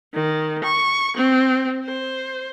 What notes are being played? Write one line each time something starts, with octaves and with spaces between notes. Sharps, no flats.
D#3
C#6
C4
C5